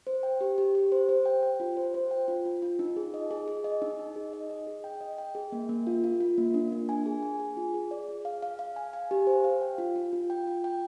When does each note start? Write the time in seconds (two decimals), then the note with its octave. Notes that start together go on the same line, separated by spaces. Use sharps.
0.07 C5
0.23 G5
0.41 G4
0.58 G4
0.75 G4
0.92 C5
1.09 C5
1.26 G5
1.43 G5
1.60 F4
1.77 C5
1.94 C5
2.11 G5
2.28 F4
2.45 F4
2.62 F4
2.79 D#4
2.96 G#4
3.14 D#5
3.31 G#4
3.48 G#4
3.64 D#5
3.82 D#4
3.99 D#4
4.16 G#4
4.33 D#5
4.50 D#5
4.67 G#4
4.84 G5
5.01 D#5
5.18 G5
5.35 G#4
5.52 A#3
5.69 A#3
5.87 F4
6.04 F4
6.20 F4
6.38 A#3
6.54 D4
6.72 A#3
6.89 G#5
7.06 G#4
7.23 G#5
7.40 G#4
7.57 F4
7.74 G#4
7.91 D5
8.09 G#4
8.25 F5
8.42 F5
8.59 F5
8.76 G#5
8.93 G#5
9.11 G4
9.27 C5
9.44 F5
9.62 G5
9.78 F4
9.96 F4
10.13 F4
10.30 G5
10.47 F4
10.64 G5